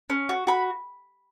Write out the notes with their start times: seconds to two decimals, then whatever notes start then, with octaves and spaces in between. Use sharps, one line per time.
0.10 C#4
0.29 F#4
0.47 F#4 B5